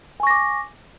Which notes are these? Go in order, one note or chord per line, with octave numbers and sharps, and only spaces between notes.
G#5 C#6 D6 A#6